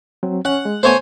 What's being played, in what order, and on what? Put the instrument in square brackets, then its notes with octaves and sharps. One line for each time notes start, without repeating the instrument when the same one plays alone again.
[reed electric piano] F#3 C4
[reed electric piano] C#4 [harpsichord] F#5
[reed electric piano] G#3
[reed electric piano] A3 B3 [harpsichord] C5 C#5 G#5